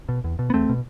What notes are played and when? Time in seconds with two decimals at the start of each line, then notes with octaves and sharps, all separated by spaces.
0.09 B2
0.24 E2
0.39 B2
0.50 B3
0.54 E2 A3 C4
0.69 B2